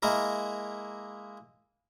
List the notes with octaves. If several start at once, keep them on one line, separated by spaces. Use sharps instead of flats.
G#3 A#3 E4 A#4